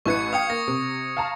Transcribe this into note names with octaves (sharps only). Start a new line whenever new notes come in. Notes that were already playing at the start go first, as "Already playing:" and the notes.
A1 E4 B4 C#6 G#6 C#7
F5 G5 D#6 G#6 C#7
A#3 A#6
C3
F5 A5 A#5